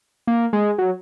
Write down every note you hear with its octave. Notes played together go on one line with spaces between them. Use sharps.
A#3
G#3
F#3